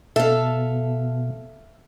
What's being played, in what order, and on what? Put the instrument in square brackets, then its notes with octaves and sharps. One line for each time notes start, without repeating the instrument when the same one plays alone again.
[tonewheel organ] B2 [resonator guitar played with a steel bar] A4 [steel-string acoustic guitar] E5 F5